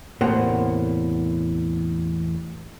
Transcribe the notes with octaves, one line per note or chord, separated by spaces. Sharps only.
E2 A2 C3 A#3 F#5 C6